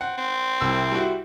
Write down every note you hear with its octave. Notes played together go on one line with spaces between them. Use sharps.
C4 F#5
C4
C2 C3 E6
G3 E4 F#4